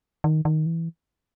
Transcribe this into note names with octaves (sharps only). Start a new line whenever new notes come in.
D#3
D#3
E3